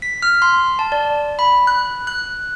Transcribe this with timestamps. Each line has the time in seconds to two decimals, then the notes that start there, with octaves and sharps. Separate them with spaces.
0.02 B6
0.22 F6
0.42 C6
0.79 A5
0.92 D5
1.39 B5
1.67 F#6
2.07 F#6